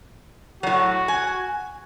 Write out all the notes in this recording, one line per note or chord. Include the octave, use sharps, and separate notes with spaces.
A2 F#3 F#4
G#5